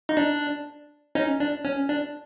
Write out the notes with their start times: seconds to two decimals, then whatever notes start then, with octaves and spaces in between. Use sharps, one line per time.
0.09 D#4
0.17 D4
1.15 C#4 D#4
1.40 D4
1.65 C#4
1.89 D4